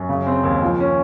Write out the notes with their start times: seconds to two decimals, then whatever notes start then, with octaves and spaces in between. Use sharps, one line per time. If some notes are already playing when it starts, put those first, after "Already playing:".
Already playing: F#2
0.09 C#3
0.27 C4
0.43 D#2
0.62 F3
0.80 C#4